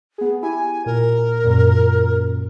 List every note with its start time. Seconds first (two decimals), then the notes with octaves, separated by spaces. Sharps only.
0.18 B3 G#4
0.43 E4 G4 G#5
0.86 A#2 A#4
1.44 F#2 A#2